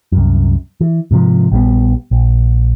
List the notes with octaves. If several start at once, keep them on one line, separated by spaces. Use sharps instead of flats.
C2 F#2
E3
G#2 C3 E3 F3
A#1 G3 B3
A#1